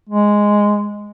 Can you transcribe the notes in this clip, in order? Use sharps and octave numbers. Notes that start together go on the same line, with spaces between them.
G#3